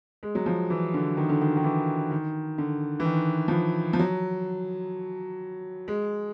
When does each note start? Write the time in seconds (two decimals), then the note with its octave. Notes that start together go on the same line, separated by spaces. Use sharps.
0.23 G#3
0.35 F#3
0.46 F3
0.70 E3
0.94 D3
1.17 D#3
1.29 D3
1.42 D#3
1.57 D#3
1.64 E3
2.11 D#3
2.58 D3
3.00 E3
3.05 D#3
3.48 F3
3.52 E3
3.93 F3
3.99 F#3
5.88 G#3